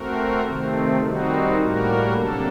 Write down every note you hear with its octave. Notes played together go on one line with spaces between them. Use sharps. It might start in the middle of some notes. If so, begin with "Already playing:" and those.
Already playing: A3 C4 F#4 A#4
C3 D#3 A3 C4
D#3 G3 C4 D#4 F#4
A2 G3 A#3 F#4 A#4
C3 F#3 A#3 D4 A4